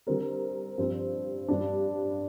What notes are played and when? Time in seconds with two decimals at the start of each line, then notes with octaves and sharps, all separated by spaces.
0.07 D3 G3 C4 A#4
0.78 G2 F3 C4
1.48 G2 G3 D4